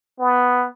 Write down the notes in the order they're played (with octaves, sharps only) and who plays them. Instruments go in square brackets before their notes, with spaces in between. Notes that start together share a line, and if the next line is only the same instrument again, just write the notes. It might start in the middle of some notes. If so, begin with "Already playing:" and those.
[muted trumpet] B3